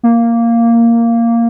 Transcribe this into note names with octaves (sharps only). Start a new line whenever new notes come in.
A#3